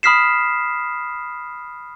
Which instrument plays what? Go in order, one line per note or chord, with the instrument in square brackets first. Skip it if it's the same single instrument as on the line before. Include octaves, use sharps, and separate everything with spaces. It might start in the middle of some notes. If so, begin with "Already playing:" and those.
[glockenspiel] B5 D#6 F6 B6 C7 E7